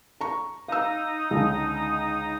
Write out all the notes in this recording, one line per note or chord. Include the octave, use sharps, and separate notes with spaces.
A#5 C#6
D#4 F5 D#6 E6
C#2 D3